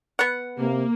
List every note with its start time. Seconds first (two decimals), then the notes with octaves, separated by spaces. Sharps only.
0.19 B3 F#5
0.58 C3 A#3